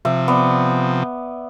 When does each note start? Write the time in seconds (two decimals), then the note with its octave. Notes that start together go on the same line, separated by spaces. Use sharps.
0.05 C3 F3 E5
0.28 B3 D5